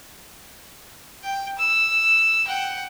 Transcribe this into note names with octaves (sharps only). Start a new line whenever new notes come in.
G5
E6
F#5 G5